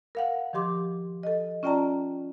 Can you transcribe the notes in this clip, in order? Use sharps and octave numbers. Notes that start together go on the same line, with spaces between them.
A#4 F5 F#5
D#3 F3 G4 C6 D6
A4 D#5
C#4 F4 D5 G5 A5 A#5